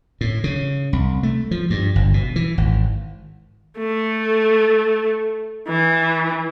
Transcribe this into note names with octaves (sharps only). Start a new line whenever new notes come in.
A2
C#3
C2
A3
F3
G2
G1
B2
E3
G#1
A3
E3